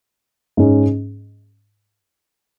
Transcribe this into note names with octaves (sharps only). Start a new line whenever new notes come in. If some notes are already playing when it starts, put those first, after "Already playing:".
G#2 G#3 C#4 G#4